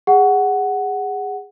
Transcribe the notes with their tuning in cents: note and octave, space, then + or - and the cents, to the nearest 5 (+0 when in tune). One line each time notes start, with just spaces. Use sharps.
G#4 -20 F#5 +5